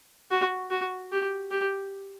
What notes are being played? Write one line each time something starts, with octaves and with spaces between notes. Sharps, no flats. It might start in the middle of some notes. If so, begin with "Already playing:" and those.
F#4
F#4
G4
G4